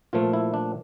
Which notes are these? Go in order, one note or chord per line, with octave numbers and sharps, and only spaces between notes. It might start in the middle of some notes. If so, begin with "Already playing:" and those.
A#2 F3 A3 F4
E4
D4